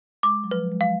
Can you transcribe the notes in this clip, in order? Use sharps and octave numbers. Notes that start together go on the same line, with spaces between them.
G#3 D6
F#3
F3 B4
G#3
F#3 F5